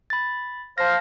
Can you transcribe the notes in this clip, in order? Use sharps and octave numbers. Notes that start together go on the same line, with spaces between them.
B5 A6
C5 F5 A5 A#6